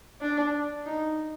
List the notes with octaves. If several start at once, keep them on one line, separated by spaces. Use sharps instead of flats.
D4
D#4